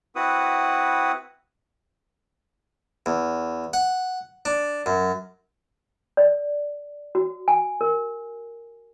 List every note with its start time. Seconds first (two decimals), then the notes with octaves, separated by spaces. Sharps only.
0.16 C4 E4 F#4 B4 F#5 D#6
3.06 E2
3.73 F#5
4.45 D4
4.86 F#2
6.17 D5
7.15 F#4
7.48 G#5
7.81 A#4